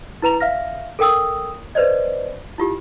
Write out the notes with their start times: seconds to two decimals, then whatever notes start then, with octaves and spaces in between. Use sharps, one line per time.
0.22 E4 B4 A#5 F7
0.40 E5 F5 F6 A#6
0.99 A4 A#4 G5 D#6 E6
1.75 B4 C5 D5 D#5
2.58 E4 F4 G4